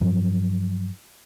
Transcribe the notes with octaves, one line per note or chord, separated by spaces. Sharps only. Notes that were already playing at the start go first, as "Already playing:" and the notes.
G2 F3 F#3